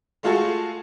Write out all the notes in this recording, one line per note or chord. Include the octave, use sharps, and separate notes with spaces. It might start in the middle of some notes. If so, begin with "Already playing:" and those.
G#3 A3 F4 F#4 G#4 A4